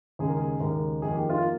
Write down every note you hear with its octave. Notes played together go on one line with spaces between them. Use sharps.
D#2 C#3 G#3 G#4
A#4
G#4
D#2 C#3 G#3 A#4
F2 D#3 A#3 G#4
G4
F4
A#3